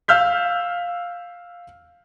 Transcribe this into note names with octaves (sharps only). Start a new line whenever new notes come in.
F5 E6 F6 G6 B6